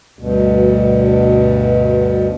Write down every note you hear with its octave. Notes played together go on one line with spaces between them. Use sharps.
D2 G2 B2